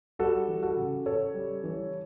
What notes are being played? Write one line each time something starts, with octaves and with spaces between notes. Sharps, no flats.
G3 F#4 A4
E3
F#4 A4
C#3
C#3 A4 C#5
G3
E3